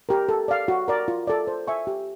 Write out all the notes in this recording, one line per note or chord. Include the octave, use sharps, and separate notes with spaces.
G4 A#4
A4
D5 F5
F#4
A#4 D5
F4
A4 D5
C5
E5 G#5 C#6
G4